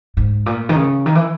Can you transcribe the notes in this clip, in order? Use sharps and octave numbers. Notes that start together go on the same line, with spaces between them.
G#2
A#2
D#3
C#3
D#3
E3